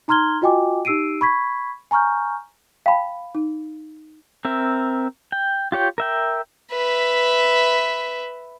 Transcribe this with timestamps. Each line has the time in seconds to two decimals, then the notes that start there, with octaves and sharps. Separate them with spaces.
0.08 D#4 A#5 C6 F6 G#6 G7
0.42 F4 F#4 D#5 G5 G#5 D6
0.85 D#4 G4 E6 C7 D7 D#7
1.21 B5 C#6 G#6 B6
1.91 G#5 A#5 C#6 F6 G6
2.86 F5 G5 A5 B5
3.35 D#4
4.45 C4 A#4 E5
5.32 G5
5.72 F4 G4 C#5 G5
5.98 A#4 E5 G5
6.73 B4 E5